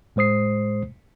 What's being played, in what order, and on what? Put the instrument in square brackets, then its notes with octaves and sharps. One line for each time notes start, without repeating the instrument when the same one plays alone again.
[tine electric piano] A2 G#3 C5 D#6 C7